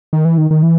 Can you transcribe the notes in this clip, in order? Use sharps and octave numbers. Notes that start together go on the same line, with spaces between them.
D#3
E3
D#3
D#3
E3